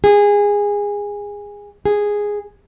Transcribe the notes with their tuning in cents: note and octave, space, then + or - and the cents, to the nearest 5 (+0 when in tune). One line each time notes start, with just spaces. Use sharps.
G#4 -20
G#4 -5